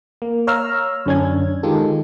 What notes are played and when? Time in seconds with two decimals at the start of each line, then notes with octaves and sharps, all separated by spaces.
0.22 A#3
0.47 C#5 F5 A#5 E6 F6
1.06 F#2 D3 C#4 D4 G#6
1.63 D#3 G#3 D#4 F4 G4 A4